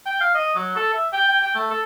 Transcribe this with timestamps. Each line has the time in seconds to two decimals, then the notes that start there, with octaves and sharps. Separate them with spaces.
0.06 G5
0.21 F5
0.35 D#5
0.55 F#3
0.76 A4
0.93 E5
1.13 G5
1.29 G5
1.41 G5
1.55 A3
1.71 A4